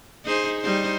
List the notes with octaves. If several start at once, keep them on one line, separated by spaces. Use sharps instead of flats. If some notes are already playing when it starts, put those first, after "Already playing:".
D#4 G#4 C5
G3 D#4 C5